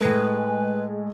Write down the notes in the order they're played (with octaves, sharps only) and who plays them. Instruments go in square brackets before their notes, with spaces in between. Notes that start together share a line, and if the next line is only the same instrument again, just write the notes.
[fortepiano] A2 A3 [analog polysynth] G#3 [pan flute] B4